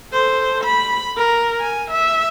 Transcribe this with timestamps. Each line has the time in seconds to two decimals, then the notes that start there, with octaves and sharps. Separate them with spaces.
0.12 A4 C5
0.64 B5
1.17 A#4
1.60 G#5
1.91 E5